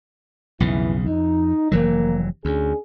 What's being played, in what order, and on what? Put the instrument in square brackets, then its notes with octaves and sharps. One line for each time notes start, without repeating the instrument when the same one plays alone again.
[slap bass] B1 F2 C#3 [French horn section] E3
[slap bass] F2 [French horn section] D#4
[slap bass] F1 E3 F#3 [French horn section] A#3
[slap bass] D2 [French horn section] C#4 D4 G#4